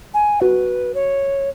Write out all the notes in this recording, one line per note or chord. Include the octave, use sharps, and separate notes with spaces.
G#5
F#4 B4
C#5